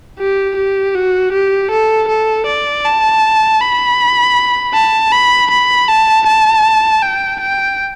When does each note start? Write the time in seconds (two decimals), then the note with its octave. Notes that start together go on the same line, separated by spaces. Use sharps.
0.19 G4
0.56 G4
0.95 F#4
1.33 G4
1.71 A4
2.08 A4
2.47 D5
2.85 A5
3.61 B5
4.74 A5
5.12 B5
5.51 B5
5.88 A5
6.26 A5
7.03 G5
7.40 G5